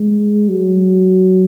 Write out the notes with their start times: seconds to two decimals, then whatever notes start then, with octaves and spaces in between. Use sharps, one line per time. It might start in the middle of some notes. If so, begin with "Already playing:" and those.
Already playing: G#3
0.49 F#3